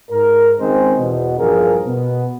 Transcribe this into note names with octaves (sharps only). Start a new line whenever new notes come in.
G#2 A#4
C#2 D#3 G#3 C4 G#4 C5
E2 B2
A#1 E2 G2 F3 G#4 A#4
B2 B3